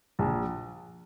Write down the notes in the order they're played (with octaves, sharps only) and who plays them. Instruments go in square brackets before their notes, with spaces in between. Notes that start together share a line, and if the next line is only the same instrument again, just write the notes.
[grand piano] A#1